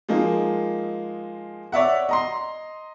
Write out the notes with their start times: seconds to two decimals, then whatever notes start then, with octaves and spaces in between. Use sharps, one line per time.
0.09 F3 G#3 A#3 D#4
1.72 C#5 D5 E5 F#5
2.09 D#5 A#5 C6